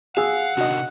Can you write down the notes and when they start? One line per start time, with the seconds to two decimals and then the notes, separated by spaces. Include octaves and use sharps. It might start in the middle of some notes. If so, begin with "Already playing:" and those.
0.17 G#4 F5 F#5 E6
0.57 C3 D#3 D4 F#4 D#5